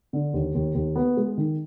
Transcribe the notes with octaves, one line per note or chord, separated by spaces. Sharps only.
D3
D#2
D#2
D#2
B3
G#3
D#3